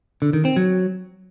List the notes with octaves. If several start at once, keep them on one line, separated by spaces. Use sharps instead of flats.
D3
D#3
C4
F#3